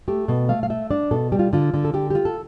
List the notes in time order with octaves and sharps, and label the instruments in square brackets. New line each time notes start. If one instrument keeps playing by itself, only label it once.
[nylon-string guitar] A3 G4
B2 A4
A3 F5
F5
A3 E5
D4 D5
B2 A4
G3 G4
F4
D3 F4
D3
A4
D3 G4
F4 G4
A4